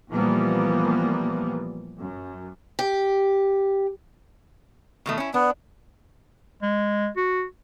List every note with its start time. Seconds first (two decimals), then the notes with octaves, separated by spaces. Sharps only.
0.10 A#2 E3 F3 G3 A#3 B3
1.98 F#2
2.79 G4
5.06 B2 D#3 A3
5.18 C#4 E4
5.34 B3 D4
6.62 G#3
7.17 F#4